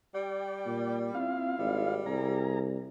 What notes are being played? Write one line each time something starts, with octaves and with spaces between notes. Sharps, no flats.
G3 D5 G5
A#2
C4 E4 F4 F5
G#1 G3
C2 G#4 A#5